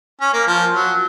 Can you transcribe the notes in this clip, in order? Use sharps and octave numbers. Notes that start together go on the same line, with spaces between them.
C#4
A#3
F3
F#3